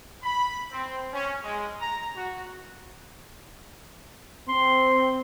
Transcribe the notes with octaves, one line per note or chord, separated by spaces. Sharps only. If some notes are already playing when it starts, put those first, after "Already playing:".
B5
C4
C#4
G#3
A#5
F#4
C4 C6